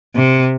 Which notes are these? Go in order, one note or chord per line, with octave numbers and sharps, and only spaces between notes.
C3